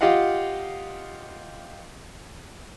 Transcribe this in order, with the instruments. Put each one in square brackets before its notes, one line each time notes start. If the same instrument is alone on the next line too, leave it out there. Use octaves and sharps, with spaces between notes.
[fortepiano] F4 G4 D#5 F5 F#5